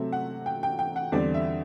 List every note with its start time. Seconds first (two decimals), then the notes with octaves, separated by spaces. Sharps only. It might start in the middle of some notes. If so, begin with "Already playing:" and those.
Already playing: C3 F#3 A3 C4 E5
0.12 F#5
0.46 G5
0.63 G5
0.79 G5
0.96 F#5
1.12 E2 D3 G3 C4 D5
1.34 E5